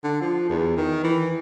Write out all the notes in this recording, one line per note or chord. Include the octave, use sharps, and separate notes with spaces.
D3
F3
E2
D#3
E3